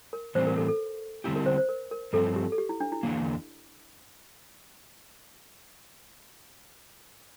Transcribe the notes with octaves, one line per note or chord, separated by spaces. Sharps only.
A#4
A2 E3 G3 C4 C5
A#4
A4
A4
D3 G3 C4 E4 G4
A#4
C5
C5
A#4
A#4
G2 F3 C4 A4
G4
A4
G4
E4
D4
E4
E2 D3 F3 A#3